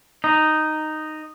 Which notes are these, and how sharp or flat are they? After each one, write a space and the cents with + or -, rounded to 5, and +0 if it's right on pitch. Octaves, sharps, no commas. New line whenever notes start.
D#4 -5